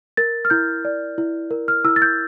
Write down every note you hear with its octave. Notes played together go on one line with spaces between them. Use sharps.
A#4 A6
F6
E4 G6
D5
E4
A#4
F6
E4 E6
A6
G6